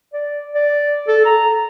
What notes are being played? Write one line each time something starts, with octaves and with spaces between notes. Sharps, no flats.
D5
D5
A4
A#5